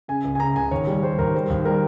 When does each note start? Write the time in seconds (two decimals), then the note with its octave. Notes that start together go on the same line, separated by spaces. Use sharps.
0.08 C#3 G#5
0.24 C#2
0.35 G#5
0.40 C#3 A#5
0.56 C#2 G#5
0.71 D#2 C#5
0.87 G3
1.03 G3 C5
1.18 D#2 A#4
1.34 G3 C5
1.50 D#2
1.65 G3 A#4